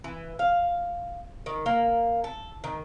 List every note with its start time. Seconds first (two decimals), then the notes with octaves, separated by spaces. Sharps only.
0.04 E3
0.39 F5
1.46 D#3
1.66 A#3
2.24 A4
2.64 D#3